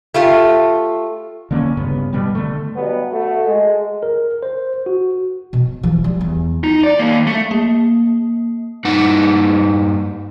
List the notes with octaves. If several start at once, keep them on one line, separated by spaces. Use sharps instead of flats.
A3 F4 G4
D3 A#3 B3 C#4
G2 C#3 B3
B2 G3 B3
D3 A3
G2 B2 F#3 B3
A3 F#4
G#3
A#4
C5
F#4
B2
E3 F3
G3
E2
D#4
D5
D#2 A#3
A3
A#3
G2 D#4 F#5